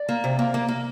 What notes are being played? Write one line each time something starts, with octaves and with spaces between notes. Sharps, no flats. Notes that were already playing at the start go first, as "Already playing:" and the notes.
Already playing: D5
A#3
C3
A#3
A#3
A#3